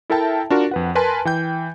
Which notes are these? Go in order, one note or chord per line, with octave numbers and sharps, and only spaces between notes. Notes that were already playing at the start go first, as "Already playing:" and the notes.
E4 A4 A#4 E5 G5 A5
D4 F4 F#4 A#4
F2 B4 F#5
A#4 B4 G#5 A5 C6
E3 G5 G6